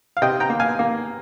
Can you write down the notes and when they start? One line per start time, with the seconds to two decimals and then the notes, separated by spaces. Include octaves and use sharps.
0.17 F5
0.22 C3 D#5 G5
0.40 G5 A#5
0.50 A#3
0.60 F5 G#5
0.79 A#3